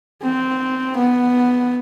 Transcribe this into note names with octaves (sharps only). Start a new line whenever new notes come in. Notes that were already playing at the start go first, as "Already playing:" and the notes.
C4
B3